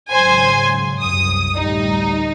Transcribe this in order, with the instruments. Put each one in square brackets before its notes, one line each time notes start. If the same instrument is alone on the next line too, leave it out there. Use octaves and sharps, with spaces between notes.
[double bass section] G#1 C#3 F#3 [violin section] C5 G#5 G#6
[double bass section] C2 F#2 [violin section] D#6
[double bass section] A1 D2 G3 [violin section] D#4